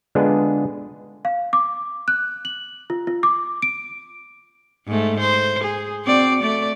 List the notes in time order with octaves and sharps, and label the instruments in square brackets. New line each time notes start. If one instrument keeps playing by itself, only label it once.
[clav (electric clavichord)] D3 G#3 B3 D4 F4 G#4
[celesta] F5
D6
F#6
F#7
F4
F4
D6
D7
[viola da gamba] G#2 A3
C5
G#4
C4 F#4 D5
A3 D5